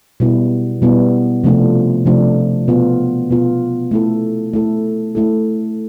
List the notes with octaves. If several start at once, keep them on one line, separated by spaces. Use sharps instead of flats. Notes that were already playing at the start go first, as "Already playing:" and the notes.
B2 G3 B3 E4
B2 G3 B3 E4
C3 F3 A3 D4 F4
C3 F3 A3 D4 F4
B2 B3 F4
B2 B3 F4
A3 E4 A4
A3 E4 A4
A3 E4 A4